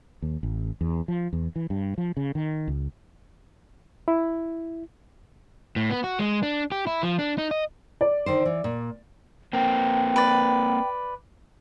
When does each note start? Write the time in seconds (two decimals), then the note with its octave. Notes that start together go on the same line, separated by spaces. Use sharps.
0.22 D#2
0.43 A1
0.81 E2
1.08 F3
1.33 E2
1.56 E3
1.70 G2
1.98 F3
2.17 C#3
2.35 D#3
2.68 C#2
4.08 E4
5.76 A2
5.90 B3
6.04 F#4
6.19 G#3
6.43 D4
6.72 G4
6.87 E4
7.03 F3
7.19 D4
7.38 D#4
7.51 D#5
8.01 D5
8.26 D3 D#3 C5
8.45 E3
8.64 A#2
9.53 A#3 C4 G5
10.16 B4 D5